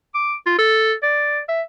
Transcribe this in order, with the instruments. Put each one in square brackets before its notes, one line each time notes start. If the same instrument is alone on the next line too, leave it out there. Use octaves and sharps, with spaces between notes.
[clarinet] D6
F4
A4
D5
E5